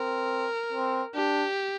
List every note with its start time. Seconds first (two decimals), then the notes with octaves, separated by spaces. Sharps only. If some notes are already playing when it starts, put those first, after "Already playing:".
Already playing: C4 A#4
0.73 C4
1.15 D4 G4